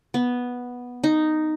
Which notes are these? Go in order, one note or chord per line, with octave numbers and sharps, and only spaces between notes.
B3
D#4